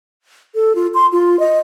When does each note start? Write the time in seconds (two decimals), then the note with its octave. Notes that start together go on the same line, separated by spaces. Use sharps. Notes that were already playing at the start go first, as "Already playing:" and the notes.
0.55 A4
0.75 F4
0.94 C6
1.12 F4
1.39 D#5